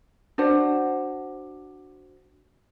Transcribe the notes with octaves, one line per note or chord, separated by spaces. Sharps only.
D4 F#4 C5 F#5